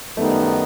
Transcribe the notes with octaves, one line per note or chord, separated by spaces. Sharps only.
F#2 D#3 G3 A3 B3 D#4